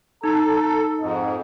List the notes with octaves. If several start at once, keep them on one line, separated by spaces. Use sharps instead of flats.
D#4 A4 A#5
F2 G#2 D#5